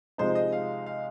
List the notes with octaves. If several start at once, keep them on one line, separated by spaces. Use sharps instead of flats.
C3 F3 G#3 D#4 C5
D#5
F5
F5